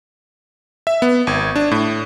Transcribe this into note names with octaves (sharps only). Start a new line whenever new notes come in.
E5
B3
G#1
D4
A2